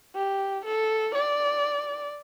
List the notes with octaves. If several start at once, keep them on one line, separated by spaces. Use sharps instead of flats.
G4
A4
D5